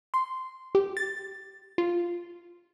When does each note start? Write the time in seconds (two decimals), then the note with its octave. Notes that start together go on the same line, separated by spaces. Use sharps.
0.14 C6
0.75 G4
0.97 A6
1.78 F4